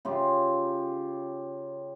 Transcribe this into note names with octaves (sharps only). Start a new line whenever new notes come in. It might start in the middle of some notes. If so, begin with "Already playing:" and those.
C#3 F4 G4